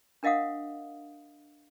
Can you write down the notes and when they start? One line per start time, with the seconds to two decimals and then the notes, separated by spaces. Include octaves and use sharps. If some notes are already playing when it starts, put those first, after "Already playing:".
0.23 D4 A#4 D#5 F5 F#5 D#6